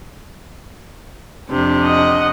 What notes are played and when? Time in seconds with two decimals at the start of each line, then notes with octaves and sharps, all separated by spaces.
1.50 F2 C3 D4
1.84 D#5 F#5